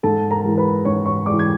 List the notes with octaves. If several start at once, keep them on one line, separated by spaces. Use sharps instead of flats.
G#2 A4 A5
A#4 A#5
E3 G#3
B4 B5
G#2 C#5 C#6
C#5 C#6
E3 G#3 D5 D6
G#6